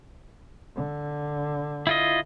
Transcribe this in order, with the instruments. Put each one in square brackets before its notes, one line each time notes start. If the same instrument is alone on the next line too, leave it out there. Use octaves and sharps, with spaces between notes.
[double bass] D3
[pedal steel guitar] E4 F4 D#5